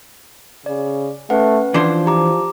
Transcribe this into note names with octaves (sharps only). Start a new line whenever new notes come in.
C#3 D5
A3 C#4 B4 F#5
E3 F3 D4 C5
G4 A#5 D6